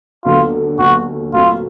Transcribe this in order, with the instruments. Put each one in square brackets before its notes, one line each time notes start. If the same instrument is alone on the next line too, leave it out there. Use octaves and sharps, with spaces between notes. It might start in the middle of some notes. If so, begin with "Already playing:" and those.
[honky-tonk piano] D#2 D3 F#3 B3 [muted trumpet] F4
[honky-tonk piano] D#2 D3 F#3 B3 [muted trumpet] F#4
[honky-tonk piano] A#2 F#3 A3 C4 [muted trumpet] F4